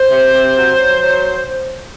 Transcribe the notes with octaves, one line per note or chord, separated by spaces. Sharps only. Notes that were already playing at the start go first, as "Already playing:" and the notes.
Already playing: C5
C3
C3
F#3
F#3
F#3